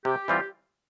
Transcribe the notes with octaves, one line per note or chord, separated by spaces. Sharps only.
C3 G4
E3 G3 C4 F4